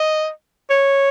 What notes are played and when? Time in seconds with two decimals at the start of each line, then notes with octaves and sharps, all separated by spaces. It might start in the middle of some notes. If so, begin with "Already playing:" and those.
Already playing: D#5
0.70 C#5